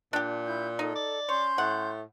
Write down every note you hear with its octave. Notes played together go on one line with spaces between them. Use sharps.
A#2 D4 G4
E4 G6
D#4 A4
D5
C#4 C#5 C6 G6
A2 F#5